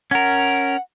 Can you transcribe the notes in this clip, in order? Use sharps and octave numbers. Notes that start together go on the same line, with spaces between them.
C#4 A#4 F#5